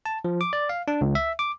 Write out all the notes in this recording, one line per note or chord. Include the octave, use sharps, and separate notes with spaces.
A5
F3
D6
D5
F5
D4
C#2
E5
D6